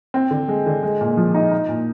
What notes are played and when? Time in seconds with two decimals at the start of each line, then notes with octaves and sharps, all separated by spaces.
0.14 C4
0.31 D3
0.48 G#3
0.66 D3
0.83 G#3
1.01 A#2
1.17 F3
1.35 D#4
1.52 D#4
1.69 A#2